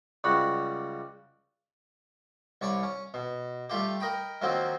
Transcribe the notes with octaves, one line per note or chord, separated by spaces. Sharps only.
C#2 G3 F#4 B5
C2 C#5 D5 B5 C#6
C#4
B2
G3 A3 F4 G4
A#4 D#5 G5 B5
D#3 F3 F#3 A#3 C4